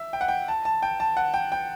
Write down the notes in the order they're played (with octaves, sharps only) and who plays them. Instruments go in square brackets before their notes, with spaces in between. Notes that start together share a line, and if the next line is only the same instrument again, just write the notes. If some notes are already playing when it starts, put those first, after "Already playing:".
Already playing: [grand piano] E5
G5
F#5
G5
A5
A5
G5
A5
F#5
G5
G5